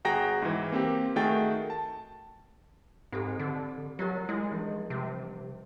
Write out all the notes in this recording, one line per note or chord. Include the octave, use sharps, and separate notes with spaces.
G1 F#4 G#4 G5 A#5 A#6
G#2 E3
A#3 C4 G4
D#3 A3 F#4 G#4 G5 A6
A5
G#2 C4 G4 A4
D3
F#3 F4 G4 A#4
G#3 E4
E3 F3 G3
C3